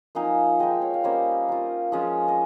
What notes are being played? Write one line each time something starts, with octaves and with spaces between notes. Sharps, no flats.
F3 A#3 D#4 F5 G#5
G#3 D#4 D#5 G5
C#5 F5
F5
G3 A#3 C#4 C5 D#5
A#3 F4
F3 G#3 C#4 F4
D#5